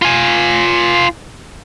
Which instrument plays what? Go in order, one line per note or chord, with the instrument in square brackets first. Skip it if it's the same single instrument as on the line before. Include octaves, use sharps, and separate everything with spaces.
[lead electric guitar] F4 G#5